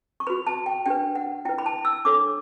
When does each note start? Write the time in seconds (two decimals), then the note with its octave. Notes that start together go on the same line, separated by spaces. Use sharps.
0.20 C#6
0.27 F#4 B4 B5
0.47 A5
0.66 G5
0.86 D4 G4 B4 G5
1.16 F#5
1.45 E4 G5
1.49 B4
1.58 B5
1.66 A5
1.85 E6
2.05 D4 A4 C#5 D6